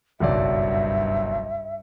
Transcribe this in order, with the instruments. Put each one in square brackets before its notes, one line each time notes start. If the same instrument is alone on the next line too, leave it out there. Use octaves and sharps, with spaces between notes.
[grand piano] F#1 B1 D5 [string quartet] G2 [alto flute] E5